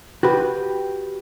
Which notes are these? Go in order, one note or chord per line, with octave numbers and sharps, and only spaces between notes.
F#4 G4 B4